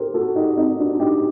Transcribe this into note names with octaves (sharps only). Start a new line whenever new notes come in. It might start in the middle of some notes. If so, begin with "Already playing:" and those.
Already playing: G4 A4 A#4 C5
F#4 A4
D#4 G4
C4 D#4
D4 F#4
D#4 G4